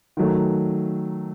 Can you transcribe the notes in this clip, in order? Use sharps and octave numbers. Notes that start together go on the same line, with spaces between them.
D#3 F#3 A3